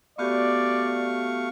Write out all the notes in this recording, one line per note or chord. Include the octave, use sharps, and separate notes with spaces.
A3 B3 F#4 G4 D5 F5 C#6